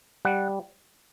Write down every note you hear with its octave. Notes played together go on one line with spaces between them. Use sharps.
G3 F#5